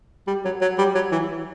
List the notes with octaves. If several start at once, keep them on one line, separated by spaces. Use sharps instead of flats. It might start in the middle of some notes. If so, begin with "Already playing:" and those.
G3
F#3
F#3
G3
F#3
E3